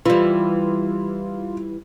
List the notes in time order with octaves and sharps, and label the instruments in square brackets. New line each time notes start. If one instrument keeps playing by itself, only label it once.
[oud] E3 G3 [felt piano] F4